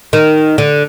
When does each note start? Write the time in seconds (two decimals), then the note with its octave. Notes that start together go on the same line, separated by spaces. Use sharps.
0.13 D#3
0.58 D3